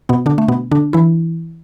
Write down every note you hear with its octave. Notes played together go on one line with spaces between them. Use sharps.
B2 B3
D3 D4
A3
B2 B3
D3 D4
E3 E4